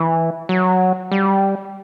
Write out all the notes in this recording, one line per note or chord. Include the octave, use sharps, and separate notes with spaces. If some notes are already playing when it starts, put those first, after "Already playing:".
Already playing: E3
F#3
G3